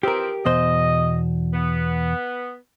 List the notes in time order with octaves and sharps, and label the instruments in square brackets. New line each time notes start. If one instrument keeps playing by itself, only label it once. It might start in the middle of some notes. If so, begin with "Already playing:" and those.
[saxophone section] E3 F3 C4 [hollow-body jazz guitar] G4 A#4
[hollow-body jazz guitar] E2 B2 C5 [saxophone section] D#5
[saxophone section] B3